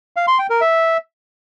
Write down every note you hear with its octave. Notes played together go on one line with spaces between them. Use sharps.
F5
C6
G5
A#4
E5